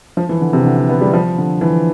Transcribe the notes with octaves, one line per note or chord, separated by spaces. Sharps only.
F3
E3
D3
C3
D3
D3
B3
G3
F3
D3
E3